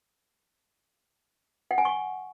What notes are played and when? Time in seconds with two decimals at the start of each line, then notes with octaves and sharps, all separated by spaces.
1.71 F#5
1.78 G#5
1.85 C#6